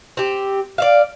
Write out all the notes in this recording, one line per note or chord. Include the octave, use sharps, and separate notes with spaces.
C4 G4
D5 E5 F5